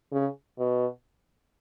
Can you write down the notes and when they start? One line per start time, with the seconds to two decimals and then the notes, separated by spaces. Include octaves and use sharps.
0.12 C#3
0.58 B2